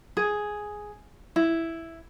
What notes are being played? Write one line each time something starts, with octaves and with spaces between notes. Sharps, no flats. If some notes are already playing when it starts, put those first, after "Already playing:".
G#4
E4